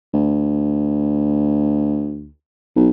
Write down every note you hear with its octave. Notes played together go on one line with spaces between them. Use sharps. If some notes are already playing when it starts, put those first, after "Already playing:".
D2
B1